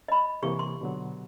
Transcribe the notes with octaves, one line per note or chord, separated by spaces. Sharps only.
D#5 B5
C3 E3 A#3 G4 C#6
C6
B2 D3 F#3